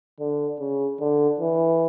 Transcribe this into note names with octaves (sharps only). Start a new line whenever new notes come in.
D3
C#3
D3
E3